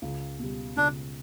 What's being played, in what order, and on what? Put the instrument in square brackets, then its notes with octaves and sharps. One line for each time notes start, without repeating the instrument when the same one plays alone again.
[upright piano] C#2
B2 G3
[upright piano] C#2 [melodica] D4